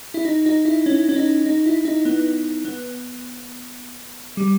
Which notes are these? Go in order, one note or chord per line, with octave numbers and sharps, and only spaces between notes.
E4
D#4
D#4
E4
C#4
C#4
D#4
D#4
E4
D#4
B3
B3
G3